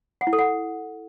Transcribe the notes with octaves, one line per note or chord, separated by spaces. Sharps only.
F#5
E4
A4
F#5